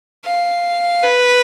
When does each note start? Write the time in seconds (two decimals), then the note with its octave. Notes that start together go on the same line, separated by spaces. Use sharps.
0.25 F5
1.03 B4